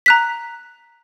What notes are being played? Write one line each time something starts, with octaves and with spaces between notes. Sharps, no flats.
A#5 F#6 B6